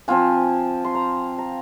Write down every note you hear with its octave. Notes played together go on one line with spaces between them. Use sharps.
F3 C4 F4 G#5
C6
A#5
A#5